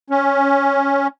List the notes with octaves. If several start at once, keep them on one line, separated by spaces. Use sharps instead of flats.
C#4